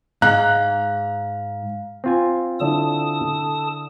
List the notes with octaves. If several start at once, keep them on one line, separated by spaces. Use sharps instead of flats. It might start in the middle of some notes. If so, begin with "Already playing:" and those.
G#2 F5 A#5 F#6
C4 F4 G#5
D3 E4 A4 D5 A5 D#6